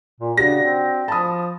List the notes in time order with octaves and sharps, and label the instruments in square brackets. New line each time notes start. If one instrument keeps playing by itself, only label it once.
[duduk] A#2
[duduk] C#3 [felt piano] D4 F#4 G4 [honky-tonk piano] A#6
[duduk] C4
[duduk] F3 [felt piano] A5 B5 D#6